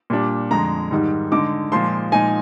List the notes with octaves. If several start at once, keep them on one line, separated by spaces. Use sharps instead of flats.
A#2 G3 D4
F2 D3 G#3 A#5
G#2 D#3 G3
D3 G#3 D#4 D6
A#2 F3 G#3 C6
A#2 F3 G#3 D#4 G#5